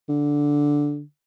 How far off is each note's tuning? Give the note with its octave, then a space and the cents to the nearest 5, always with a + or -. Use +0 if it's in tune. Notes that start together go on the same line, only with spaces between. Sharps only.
D3 -5